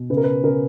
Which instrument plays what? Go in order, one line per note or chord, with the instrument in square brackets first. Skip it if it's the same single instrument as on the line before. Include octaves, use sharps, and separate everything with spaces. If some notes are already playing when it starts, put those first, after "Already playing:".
Already playing: [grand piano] B2
C#3 B4
A#4
B4
C#3 A#4